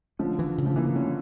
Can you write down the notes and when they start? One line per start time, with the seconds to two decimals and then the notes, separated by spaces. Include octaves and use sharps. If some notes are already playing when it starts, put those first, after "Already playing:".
0.19 D3 F3 C#4
0.39 E3
0.58 C#3
0.66 F3
0.76 E3 A#3
0.95 D3 C#4